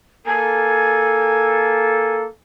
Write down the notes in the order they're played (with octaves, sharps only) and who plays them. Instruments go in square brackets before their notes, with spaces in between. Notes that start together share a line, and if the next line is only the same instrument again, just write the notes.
[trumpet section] A#3 A4 [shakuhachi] G#5